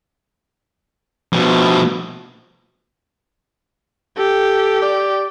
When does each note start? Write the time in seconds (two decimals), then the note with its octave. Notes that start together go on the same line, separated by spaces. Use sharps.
1.33 B2 F3
4.18 G4 A4
4.82 D5